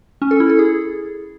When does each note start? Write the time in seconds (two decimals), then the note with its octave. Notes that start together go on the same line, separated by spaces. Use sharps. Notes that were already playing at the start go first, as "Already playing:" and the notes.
0.22 C#4
0.31 A4
0.40 E4
0.49 A4
0.59 G#4